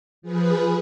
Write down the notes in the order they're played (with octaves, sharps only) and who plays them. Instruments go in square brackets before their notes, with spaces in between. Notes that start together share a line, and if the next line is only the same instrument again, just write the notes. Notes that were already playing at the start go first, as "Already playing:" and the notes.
[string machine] F3 G#4 B4